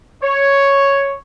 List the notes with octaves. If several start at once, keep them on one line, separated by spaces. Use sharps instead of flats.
C#5